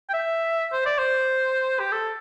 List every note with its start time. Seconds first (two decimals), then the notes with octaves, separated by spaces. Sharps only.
0.09 G5
0.13 E5
0.73 C5
0.86 D5
0.99 C5
1.80 G4
1.92 A4